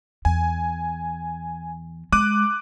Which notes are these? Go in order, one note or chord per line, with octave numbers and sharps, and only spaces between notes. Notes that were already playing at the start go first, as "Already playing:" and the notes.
E2 G#5
G#3 D6 F#6 D#7